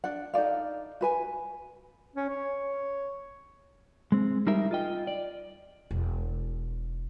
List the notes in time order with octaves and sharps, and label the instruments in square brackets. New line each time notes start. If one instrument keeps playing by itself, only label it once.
[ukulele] D4 F#5
D#4 A4 D5 F5
F#4 B4 G#5
[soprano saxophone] C#4
C#5
[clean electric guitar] G#3 C4
G3 D#4 G#4 A#4 E5
F4 D#5 G5
D5
[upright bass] E1